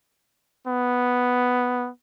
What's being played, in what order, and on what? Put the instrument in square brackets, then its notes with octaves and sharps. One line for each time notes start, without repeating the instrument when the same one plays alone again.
[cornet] B3